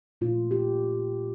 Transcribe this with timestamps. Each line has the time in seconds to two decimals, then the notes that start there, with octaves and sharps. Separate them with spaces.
0.21 A#2 A3 F4
0.51 G4